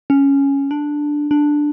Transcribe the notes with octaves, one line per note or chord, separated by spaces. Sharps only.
C#4
D4
D4